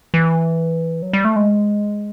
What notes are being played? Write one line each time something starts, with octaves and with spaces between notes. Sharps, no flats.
E3
F#3
G3
A3
G#3